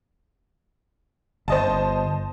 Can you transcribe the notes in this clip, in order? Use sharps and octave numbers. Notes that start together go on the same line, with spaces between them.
G1 C5 D#5 A5